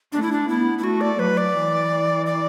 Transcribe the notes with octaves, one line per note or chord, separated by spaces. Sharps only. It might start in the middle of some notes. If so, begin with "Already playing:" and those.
A3 D4
E4
D4
B3 E4
E4
A3 F#4
D5
F#3 B4
D5
E3
D5